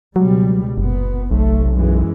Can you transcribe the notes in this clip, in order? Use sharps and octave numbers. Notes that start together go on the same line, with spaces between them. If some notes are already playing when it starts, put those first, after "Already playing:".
C#2 B2 F#3 G3
F#1 A#2 B3
B1 C3 A3
F#2 E3 G#3